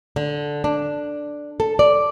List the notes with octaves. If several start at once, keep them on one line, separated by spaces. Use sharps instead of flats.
D3
D4
A4
D5